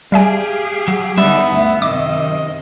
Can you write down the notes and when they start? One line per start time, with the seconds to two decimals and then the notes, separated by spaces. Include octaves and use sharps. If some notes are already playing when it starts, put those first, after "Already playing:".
0.12 G3 G4 G#4 E5 F5 G#5
0.88 F#3
1.18 D3 G3 B3 D#4 E5
1.47 D2 G2
1.82 F#2 C3 D#3 D#5 D6